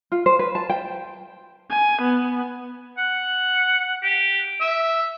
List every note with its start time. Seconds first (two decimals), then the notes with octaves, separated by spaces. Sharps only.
0.12 F4
0.26 C5
0.39 B4
0.55 A5
0.70 G5
1.70 G#5
2.02 B3
2.98 F#5
4.03 G4
4.61 E5